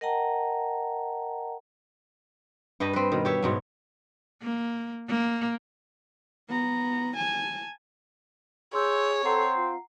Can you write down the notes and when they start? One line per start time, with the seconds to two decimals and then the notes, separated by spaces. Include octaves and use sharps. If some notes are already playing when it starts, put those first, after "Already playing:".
0.01 A#4 D#5 F#5 G5 A5 A#5
2.80 G2 G3 G4 D#5
2.93 C4 B4
3.12 B2 D#3
3.25 G4 C#5 E5
3.42 G#2 B2 F#3
4.43 A#3
5.08 A#3
6.48 B3 A#5
7.17 G#5 A5
8.74 G#4 C#5 C6 E6 G6
9.25 C4 A4 F#5 A#5 C7
9.56 F4